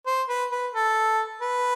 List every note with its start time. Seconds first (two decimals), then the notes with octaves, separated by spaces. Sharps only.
0.07 C5
0.29 B4
0.52 B4
0.74 A4
1.42 B4